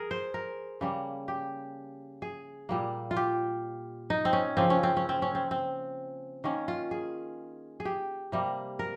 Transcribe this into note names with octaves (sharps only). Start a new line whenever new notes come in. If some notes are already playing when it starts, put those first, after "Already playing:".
Already playing: G#4 A#4
C5
A#4
C#3 G3 A#3
G4
G#4
A#2 G3 A#3
F4
G4
D#4
C4
C#4
C#3 F3 A#3 C4
C#4
C4
C#4
C4
C#4
C4
C4
D#3 A#3 C#4
F4
G#4
G#4
G4
C3 G3 A#3
A#4